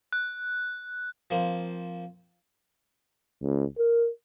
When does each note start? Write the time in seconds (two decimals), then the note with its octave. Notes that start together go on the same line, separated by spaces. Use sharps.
0.13 F#6
1.30 F3 A#3 C4
3.42 C#2
3.78 A#4